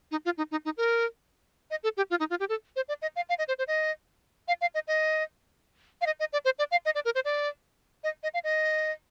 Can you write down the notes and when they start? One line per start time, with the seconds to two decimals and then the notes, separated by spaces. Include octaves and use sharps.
0.11 D#4
0.25 F4
0.38 D#4
0.51 D#4
0.65 D#4
0.77 A#4
1.71 D#5
1.83 A4
1.97 G4
2.10 F4
2.20 D#4
2.30 F4
2.40 G4
2.49 A4
2.76 C5
2.88 D5
3.02 D#5
3.16 F5
3.29 F5
3.39 D#5
3.48 C5
3.58 C5
3.68 D#5
4.48 F5
4.61 F5
4.74 D#5
4.88 D#5
6.01 F5
6.06 D#5
6.20 D#5
6.33 D5
6.45 C5
6.59 D5
6.71 F5
6.85 D#5
6.95 D5
7.05 A#4
7.15 C5
7.25 D5
8.04 D#5
8.23 D#5
8.34 F5
8.44 D#5